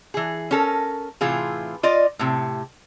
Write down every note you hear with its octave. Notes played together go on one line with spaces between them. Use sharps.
E3 G#4
C#4 A4 A#4
A2 C3 E3 F4 G#4
F4 D5 D#5
A2 C3